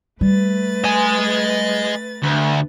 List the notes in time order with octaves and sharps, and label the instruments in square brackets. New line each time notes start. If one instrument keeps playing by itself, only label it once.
[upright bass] G3 [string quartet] A3 B4 A6
[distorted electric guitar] D#5 G#5
D2